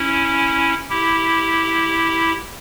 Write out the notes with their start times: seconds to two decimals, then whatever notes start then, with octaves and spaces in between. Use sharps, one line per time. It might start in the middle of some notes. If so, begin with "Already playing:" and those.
Already playing: C#4 E4
0.90 E4 G4